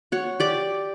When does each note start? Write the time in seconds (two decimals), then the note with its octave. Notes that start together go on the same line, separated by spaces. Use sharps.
0.12 F#4 C#5
0.40 G4 D5 D6